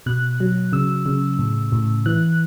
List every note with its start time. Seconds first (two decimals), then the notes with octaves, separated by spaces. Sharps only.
0.06 B2 F#6
0.40 F#3
0.73 C#3 E6
1.06 C#3
1.39 A2
1.72 A2
2.06 E3 F#6